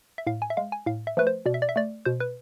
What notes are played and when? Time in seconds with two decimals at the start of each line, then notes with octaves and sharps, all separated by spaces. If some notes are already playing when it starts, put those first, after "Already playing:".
0.18 E5
0.27 A2 F5
0.42 G#5
0.50 E5
0.57 G#3 F5
0.72 G#5
0.86 A2 F5
1.07 E5
1.17 F3 A3 B4
1.27 C5
1.46 B2 D5
1.54 E5
1.62 D5
1.69 E5
1.76 A3 D5
2.05 B2 C5
2.20 B4